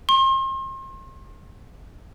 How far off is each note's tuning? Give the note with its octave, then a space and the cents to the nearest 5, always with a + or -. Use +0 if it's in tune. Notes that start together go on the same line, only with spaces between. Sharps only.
C6 +40